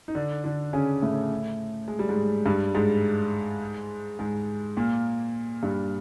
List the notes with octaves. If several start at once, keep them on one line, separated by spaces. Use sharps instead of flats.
D#4
D3 D4
D3 D4
C#3 C#4
A2 A3
G#3
G3
G#2 G#3
G2 G3
G#2 G#3
G#2 G#3
A#2 A#3
G2 G3